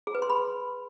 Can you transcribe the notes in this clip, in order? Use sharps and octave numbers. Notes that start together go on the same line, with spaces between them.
G#4
B4
C6
B5